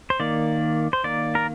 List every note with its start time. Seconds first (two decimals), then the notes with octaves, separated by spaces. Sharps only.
0.10 C5
0.20 D#3 A#3 D5
0.93 C5
1.04 D#3 A#3 D5
1.35 A#4